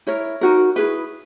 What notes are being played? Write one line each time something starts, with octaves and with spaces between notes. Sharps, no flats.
E4 A#4 C#5
D#4 F#4 A#4
E4 G#4 B4